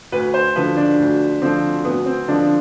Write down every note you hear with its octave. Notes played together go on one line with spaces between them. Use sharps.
D2 B4
C5
D3 F3 B4
D4
D2
D3 F3 C4
D2 B3
C4
D3 F3 D4